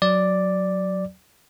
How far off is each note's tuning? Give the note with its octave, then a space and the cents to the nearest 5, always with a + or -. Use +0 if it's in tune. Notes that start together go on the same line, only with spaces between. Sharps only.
F#3 +0 D5 +0